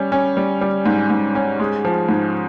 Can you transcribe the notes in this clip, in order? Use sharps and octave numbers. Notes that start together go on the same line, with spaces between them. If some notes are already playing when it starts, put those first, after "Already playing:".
Already playing: G3 C#4
C#4
G3
G3
G#2
G#2
C#4
G#3
F3
G#2